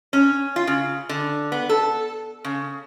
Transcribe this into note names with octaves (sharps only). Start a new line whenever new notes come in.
C#4
F4
C#3
D3
B3
A4
C#3